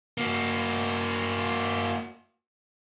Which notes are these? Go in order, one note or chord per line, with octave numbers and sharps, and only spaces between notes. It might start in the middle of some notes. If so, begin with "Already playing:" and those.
A#3 F#4